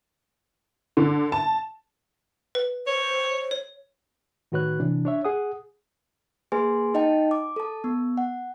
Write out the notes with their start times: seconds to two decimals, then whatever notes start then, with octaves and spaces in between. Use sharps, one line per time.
0.97 D3
1.32 A5
2.55 B4
2.87 C5 C#5
3.51 C#5
4.52 A2 D#3 F#4 B4 C#5 F#6
4.80 C3 E3 D4
5.05 D4 C#5 E5
5.25 G#4 F#5 D#6
6.52 A#3 G#4 B4 G#5 C6
6.94 D#4 D#5 G5 A5
7.31 D6
7.56 A4 A5
7.84 B3
8.17 F#5